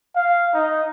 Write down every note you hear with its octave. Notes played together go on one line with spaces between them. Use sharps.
F5
D#4